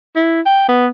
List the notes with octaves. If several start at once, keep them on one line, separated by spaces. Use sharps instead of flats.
E4
G5
B3